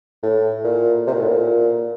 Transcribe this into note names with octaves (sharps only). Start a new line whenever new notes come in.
A2
A#2
C3
A#2
A2
A#2